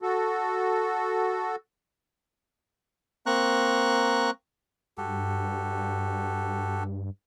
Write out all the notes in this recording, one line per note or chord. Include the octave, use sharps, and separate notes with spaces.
F#4 A4
A#3 C4 A#5 C#6 F#6
G2 F#4 G4 A4